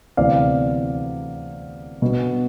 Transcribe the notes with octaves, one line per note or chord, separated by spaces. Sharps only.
D2 C3 E3 B3 D5 F5
B2 B3 D4